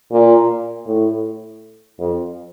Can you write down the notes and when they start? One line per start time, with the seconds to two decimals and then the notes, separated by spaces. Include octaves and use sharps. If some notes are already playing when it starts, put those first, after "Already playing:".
0.11 A#2
0.86 A2
1.99 F2